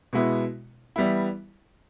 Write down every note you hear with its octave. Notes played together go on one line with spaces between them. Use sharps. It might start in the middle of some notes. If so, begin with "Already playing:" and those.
B2 G#3 B3 E4
E3 G3 B3 E4